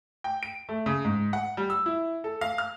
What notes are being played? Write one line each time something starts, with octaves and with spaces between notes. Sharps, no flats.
G5
D7
A3
C#3
G#2
F#5
G3
E6
E4
A4
F5
F6